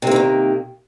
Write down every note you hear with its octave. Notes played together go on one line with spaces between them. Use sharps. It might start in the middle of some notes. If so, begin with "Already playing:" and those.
C3 D#3 E3 A#3